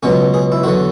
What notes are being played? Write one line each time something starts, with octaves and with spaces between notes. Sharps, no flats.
C#2 B2 F#3 C#4
G#4
E4
E2 D3 F#3 F#4